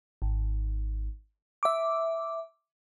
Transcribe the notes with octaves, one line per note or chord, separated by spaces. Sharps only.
G#1
E5 D6